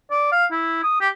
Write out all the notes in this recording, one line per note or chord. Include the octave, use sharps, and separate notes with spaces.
D5
F5
E4
D#6
G4